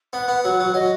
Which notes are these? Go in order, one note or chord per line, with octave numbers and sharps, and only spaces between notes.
B3 F#5
B3
F#3 F#5
F#3
F#3 D#5